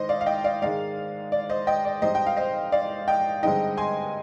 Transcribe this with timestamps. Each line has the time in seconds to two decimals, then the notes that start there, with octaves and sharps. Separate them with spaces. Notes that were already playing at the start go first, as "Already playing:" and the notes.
Already playing: G#2 D#3 C5 D#5
0.09 D5 F5
0.21 F5
0.26 D#5 G5
0.44 D5 F5
0.62 G#2 D#3 G#3 D5 F5
1.32 D5
1.50 C5 D#5
1.67 D#5 G5
1.85 D5
2.02 G#2 G3 C4 D#4 C5 D#5
2.15 G5
2.26 F5
2.37 C5 D#5
2.72 D5 F5
3.08 D#5 G5
3.43 G2 D3 G#3 C4 D#4 D#5 G5
3.77 G#5 C6